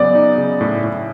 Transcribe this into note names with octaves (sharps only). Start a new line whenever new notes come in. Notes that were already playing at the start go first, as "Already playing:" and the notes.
Already playing: C#3 F#3 B3 D5
D#4
C#3
A2
A2